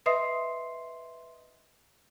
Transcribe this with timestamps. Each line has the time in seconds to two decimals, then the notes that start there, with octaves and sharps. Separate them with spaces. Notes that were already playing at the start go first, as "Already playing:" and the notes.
0.06 B4 D#5 E5 C6 D#6 C7